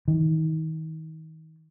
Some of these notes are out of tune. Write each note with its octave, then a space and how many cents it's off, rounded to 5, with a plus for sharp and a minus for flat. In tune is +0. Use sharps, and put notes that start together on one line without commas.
D#3 +35